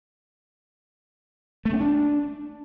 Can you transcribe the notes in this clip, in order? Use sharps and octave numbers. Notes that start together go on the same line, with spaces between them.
A3
C#4
D4